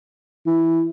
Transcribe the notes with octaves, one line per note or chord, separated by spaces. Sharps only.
E3